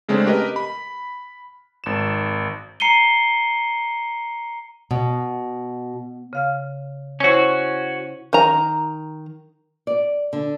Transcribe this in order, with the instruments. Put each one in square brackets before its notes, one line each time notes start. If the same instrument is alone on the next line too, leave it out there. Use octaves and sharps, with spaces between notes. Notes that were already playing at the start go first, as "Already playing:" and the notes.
[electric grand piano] C#3 G#3 A3 C4 D4
G4 A#4 B4 D#5
B5
G#1 E7
[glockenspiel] A#5 C7 C#7 D#7 G7
[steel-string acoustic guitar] B2
[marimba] C#3 F5 F6
[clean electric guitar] C#4 F#4 [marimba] E4 C5 C#5
[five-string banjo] D#3 A#5
[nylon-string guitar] D5
D3